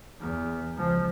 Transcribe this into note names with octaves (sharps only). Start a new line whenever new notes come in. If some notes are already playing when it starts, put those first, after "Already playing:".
E2
C#2 F3